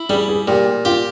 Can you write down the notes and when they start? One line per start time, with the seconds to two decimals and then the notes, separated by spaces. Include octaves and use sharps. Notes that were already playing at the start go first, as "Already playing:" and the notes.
Already playing: E4
0.10 G3 G#4
0.28 G#4
0.48 A#2 G4
0.85 F4 G4